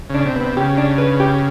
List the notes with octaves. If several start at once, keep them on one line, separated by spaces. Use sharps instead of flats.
C#3 D4
C3
C3 B3
C#3 G4
D4
B4
G4